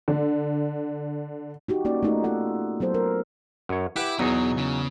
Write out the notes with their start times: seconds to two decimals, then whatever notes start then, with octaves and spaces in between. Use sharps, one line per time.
0.08 D3
1.68 D#4 F#4 G4
1.85 A#3 C#4 D#4 F#4 D5
2.03 A3 B3 D#4 F4 A4
2.24 D#4 F4 A4 F#5
2.80 F#3 B3 A4 C5
2.94 A#4
3.69 F#2 C#5
3.96 E4 G4 B4 F#5 D6
4.19 E2 B2 F#3 D#4 G#4
4.58 C#3